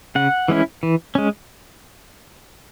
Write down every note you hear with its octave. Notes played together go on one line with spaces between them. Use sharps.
C#3 F#5
E3 G#3 C#4 E4
E3
G#3 C#4